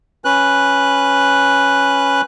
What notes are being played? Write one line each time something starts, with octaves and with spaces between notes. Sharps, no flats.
C#4 B4 F#6